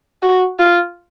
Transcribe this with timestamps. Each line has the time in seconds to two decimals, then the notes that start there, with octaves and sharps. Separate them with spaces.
0.23 F#4
0.59 F4